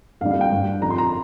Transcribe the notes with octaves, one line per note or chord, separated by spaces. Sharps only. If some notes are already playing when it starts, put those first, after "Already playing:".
F2 D3 G3 F5
F5
G5
G2 G3
F2 D3 F3 A#5
C6
A#5